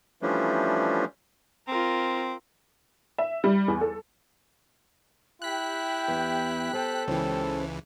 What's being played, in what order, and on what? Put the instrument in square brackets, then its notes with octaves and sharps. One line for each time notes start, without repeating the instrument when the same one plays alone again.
[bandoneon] E3 F3 G3 A3 C#4 D4
[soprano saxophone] C4 [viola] F4 A#4
[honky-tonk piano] E5
G3
E2
A4
[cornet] E4 [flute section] G4 G5 [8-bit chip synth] F#6 B6
[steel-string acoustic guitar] E2
[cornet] A4 [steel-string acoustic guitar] C5
[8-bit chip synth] C#2 E3 [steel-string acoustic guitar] C#4 C5